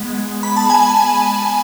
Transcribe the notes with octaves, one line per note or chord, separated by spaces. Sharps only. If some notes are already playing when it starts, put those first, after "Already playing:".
Already playing: G#3 B3
B5
A5
G#5